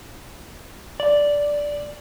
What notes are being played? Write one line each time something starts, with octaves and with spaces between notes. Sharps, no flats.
D5